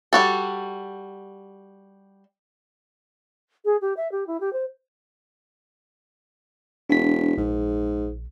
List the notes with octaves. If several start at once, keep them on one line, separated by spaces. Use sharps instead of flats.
G3 F#4 A4
G#4
G4
E5
G4
E4
G4
C5
E1 D4 B6
A#1 G#2